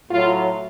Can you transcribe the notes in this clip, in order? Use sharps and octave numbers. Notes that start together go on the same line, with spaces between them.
A2 F#3 F4